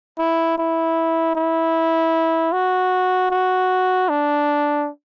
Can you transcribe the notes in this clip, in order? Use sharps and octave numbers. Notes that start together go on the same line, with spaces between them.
E4
E4
E4
F#4
F#4
D4